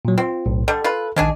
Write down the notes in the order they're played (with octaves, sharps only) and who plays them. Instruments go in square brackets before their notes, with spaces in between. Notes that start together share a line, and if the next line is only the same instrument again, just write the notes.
[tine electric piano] A#2 F#3
[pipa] C4 [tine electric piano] F4
[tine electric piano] B1 A2
[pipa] D3 G3 [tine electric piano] A4
[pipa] F4 B4
[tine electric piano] A#1 D#3 [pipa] G#3 D4 G#4